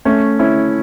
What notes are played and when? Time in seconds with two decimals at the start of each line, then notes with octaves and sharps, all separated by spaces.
0.05 A3 C#4
0.39 C#4 E4